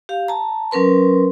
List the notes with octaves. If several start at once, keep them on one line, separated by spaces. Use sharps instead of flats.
G4 F5
A5 A#5
F#3 C#4 A#4 B4 C6